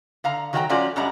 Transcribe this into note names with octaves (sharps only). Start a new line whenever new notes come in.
D3 F5 A#5
D#3 F#3 A4 F5 G5 A#5
F3 A3 C#4 F4 F#4 D5
F#2 G3 G#3 D4 A#5